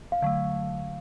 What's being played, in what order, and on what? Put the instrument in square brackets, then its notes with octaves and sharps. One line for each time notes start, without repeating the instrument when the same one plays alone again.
[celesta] F5
[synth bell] D3 F#3 A3 [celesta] F5